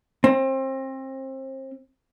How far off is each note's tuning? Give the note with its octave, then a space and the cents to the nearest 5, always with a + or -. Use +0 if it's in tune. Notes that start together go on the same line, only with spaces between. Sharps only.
C4 +30